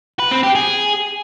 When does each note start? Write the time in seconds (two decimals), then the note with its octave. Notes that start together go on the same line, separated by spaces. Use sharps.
0.19 B4
0.31 C4
0.43 G4
0.55 G#4